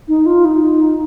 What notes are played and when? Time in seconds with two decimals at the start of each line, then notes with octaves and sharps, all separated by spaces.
0.08 D#4
0.26 F4
0.45 D#4